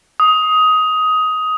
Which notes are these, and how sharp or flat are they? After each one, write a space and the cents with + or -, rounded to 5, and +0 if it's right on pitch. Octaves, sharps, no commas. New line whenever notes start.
D#6 +15